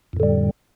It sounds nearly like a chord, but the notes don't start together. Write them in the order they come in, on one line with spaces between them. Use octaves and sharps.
F2 A2 D3 G3